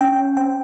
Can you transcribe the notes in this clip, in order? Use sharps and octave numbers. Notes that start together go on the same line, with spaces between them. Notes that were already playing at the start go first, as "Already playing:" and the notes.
C#4 G5
C4 G5